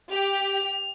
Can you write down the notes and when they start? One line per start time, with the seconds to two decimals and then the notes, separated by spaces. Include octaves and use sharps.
0.11 G4 F7